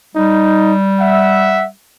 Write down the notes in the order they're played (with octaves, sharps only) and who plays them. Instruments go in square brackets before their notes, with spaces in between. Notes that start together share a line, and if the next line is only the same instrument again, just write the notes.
[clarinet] G3 [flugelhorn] D#4
[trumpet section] E5 [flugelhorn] F#5